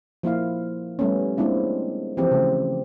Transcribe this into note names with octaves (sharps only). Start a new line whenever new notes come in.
F3 A#3 E4 F5
G3 A3 B3 C#4
G#3 A#3 C4 D4 E4 F4
E3 F3 C4 G4
C#3 A3